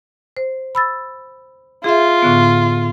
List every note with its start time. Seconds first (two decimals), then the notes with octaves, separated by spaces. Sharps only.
0.37 C5
0.75 B5 E6 A6
1.84 F4 G#4 E5
2.22 A2 D3 B3